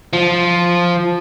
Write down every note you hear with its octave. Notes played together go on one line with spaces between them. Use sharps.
F3